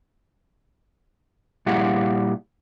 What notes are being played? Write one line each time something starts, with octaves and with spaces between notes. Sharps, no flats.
A#2 G3 E4 G#4 F5 F#5